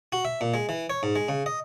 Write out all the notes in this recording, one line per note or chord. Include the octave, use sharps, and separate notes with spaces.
F#4
E5
A#2
G#3
E3
C#5
G#2
G#3
C#3
D#5